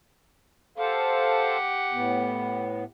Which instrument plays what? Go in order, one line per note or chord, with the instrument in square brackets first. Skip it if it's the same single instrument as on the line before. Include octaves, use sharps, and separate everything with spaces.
[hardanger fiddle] G4 F#5 [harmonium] A4 C5 F5
[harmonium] A2 B3